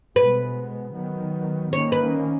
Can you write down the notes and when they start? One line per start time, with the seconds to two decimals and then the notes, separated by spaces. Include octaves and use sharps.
0.16 B2 G#3 B3 B4
0.94 D#3 F#3 B3
1.72 D#3 A#3 C#4 C#5
1.92 B4